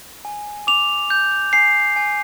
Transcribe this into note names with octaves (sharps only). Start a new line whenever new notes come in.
G#5
D6 F7
G6
G#5 C7
G#5